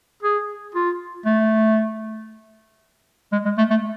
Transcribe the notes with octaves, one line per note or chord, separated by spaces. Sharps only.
G#4
F4
A3
G#3
G#3
A3
A3